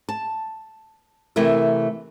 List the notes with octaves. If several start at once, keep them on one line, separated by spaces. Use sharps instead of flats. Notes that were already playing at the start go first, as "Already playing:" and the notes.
A5
C3 E3 A3 E4 A#4 E5